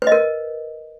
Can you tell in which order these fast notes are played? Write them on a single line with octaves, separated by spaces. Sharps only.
B4 D#5 A#4